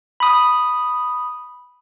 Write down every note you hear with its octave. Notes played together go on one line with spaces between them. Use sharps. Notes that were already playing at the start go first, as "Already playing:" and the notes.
B5 D#6